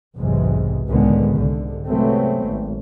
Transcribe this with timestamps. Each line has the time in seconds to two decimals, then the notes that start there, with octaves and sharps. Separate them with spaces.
0.17 B1 E2 G#2 C3 G#3
0.89 C#2 A2 D3 D#3 G#3 B3
1.36 C2 G#2 D3
1.88 C3 F#3 G#3 A3 B3 C4
2.46 G#1